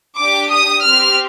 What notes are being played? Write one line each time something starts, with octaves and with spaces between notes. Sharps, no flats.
D4 G4 D6
D#6
C4 G4 F6